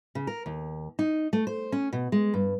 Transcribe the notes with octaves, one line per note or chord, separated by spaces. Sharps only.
C#3
A#4
D#2
D#4
A3
C5
C#4
B2
G#3
G2